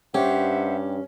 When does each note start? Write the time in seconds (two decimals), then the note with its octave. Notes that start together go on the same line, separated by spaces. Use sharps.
0.14 G2 C#4 G4 C5 E5 F#5